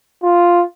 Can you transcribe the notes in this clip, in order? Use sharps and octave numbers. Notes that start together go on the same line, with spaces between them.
F4